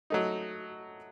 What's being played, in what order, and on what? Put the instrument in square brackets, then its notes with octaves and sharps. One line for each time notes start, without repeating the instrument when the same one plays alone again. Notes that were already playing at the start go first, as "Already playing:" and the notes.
[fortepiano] F#3 A3 D#4